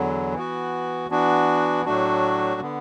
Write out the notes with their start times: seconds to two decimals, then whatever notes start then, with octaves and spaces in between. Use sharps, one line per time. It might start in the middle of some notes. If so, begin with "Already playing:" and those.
Already playing: E2 D3 F#3
0.34 E3 B3 F#4
1.10 E3 B3 D4 F#4
1.85 A2 F#3 A3 D4 F#4
2.61 D3 B3